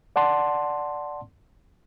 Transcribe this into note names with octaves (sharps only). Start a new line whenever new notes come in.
D5 F#5 A5 C6